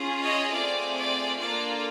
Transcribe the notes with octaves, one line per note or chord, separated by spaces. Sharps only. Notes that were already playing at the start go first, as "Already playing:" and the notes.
Already playing: C#4 F4 G#4
C#5 D#5
A3 C4 F4 G#4 D5
D5
A#3 D4 F4 A4 D5